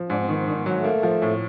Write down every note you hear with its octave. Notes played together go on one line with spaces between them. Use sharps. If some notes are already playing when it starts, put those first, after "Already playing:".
Already playing: F3
G#2 D4
C4
D#3 B3
C4
D#3 D4
B3
F#3
A3
A#3
F3
A2